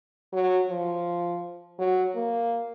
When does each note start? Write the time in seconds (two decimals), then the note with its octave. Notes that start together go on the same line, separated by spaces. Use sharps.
0.33 F#3
0.69 F3
1.79 F#3
2.15 A#3